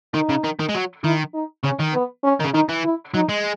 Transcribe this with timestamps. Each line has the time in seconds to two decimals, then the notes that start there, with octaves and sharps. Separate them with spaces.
0.14 D#3 D#4
0.29 C#3
0.44 D#3
0.59 D#3
0.69 G#3
0.74 F#3
1.04 D#3 E4
1.34 D#4
1.64 C#3 C#4
1.80 D#3
1.94 B3
2.24 C#4
2.40 D#3
2.44 C#3
2.54 D#3 D#4
2.69 E3
2.84 E4
3.14 F#3 D#4
3.29 G#3